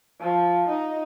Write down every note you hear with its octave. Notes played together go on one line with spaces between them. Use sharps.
F3
D#4